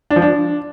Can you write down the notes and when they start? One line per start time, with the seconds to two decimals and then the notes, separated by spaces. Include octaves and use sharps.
0.10 D4
0.16 F3
0.22 D4